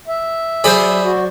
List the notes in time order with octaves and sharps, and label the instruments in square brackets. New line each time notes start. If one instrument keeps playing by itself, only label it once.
[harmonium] E5
[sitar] F#3 C5 D5 [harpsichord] G#4 B5
[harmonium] F#4